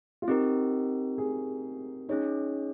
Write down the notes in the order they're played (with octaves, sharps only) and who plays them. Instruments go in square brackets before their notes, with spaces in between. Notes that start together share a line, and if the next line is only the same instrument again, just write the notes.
[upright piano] F4
[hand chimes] C4 G4 A#4 [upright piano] D#4
[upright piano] G#4
[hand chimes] C#4 G#4 C#5 [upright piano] D#4